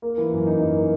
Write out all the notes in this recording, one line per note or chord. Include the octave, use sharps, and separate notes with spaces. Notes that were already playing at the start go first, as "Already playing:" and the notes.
A#3
E3
F#2
D#4
F#2
A#3